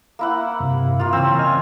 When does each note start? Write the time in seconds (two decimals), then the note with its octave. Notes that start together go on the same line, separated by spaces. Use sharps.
0.19 A#3 E4 F#5
0.60 G2 C3
0.99 A#3 F4 F5
1.13 C#3 E3 C4 C#4 E6
1.39 D#5 G#5 F6